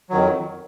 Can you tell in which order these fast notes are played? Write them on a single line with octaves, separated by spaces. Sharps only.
F#3 D#3 F2